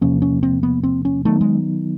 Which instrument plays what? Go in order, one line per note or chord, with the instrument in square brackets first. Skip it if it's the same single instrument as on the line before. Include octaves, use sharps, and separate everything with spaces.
[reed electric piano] E2 C3 F3 A#3 [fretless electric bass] C#4
[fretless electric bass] C#4
C4
B3
C4
C#4
[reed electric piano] D#3 F#3 B3 D#4 [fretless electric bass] A3
[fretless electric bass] G#3